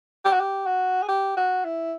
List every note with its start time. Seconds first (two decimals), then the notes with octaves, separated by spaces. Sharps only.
0.25 G4
0.33 F#4
0.40 G4
0.66 F#4
1.02 G#4
1.08 G4
1.37 F#4
1.64 E4